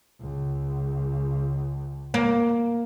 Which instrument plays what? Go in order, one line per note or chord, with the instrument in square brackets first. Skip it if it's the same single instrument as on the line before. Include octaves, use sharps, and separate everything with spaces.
[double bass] C#2
[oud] A#3